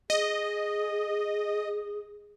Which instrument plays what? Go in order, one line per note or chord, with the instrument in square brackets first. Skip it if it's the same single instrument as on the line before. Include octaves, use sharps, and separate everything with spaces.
[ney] G#4 [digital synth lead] D#5